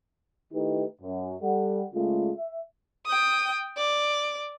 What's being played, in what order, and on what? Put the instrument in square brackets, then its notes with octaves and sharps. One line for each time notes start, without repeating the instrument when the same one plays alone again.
[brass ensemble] D#3 A3 D#4 E4 G4 B4
F#2
G3 A4 F#5
C#3 G#3 A3 F4
E5
[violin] G5 D#6
D5